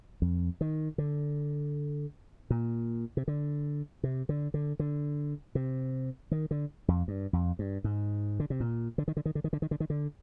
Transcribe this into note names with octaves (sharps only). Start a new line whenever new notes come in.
F2
D#3
D3
A#2
C3
D3
C3
D3
D3
D3
C3
D#3
D3
F2
G2
F2
G2
G#2
D3
C3
A#2
D3
D#3
D3
D#3
D3
D#3
D3
D#3
D3
D#3
D3